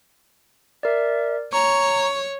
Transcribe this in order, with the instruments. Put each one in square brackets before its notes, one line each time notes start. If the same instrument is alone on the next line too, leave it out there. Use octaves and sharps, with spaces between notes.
[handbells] A#4 D5 [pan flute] E5
[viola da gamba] C#5 [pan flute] A#5 [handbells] C#6